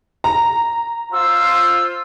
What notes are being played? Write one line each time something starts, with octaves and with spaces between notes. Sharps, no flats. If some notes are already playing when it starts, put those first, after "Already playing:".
A#5
F4 C5 E6